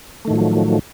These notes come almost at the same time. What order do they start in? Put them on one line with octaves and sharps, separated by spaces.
A3 D#3 A2 F3 F#3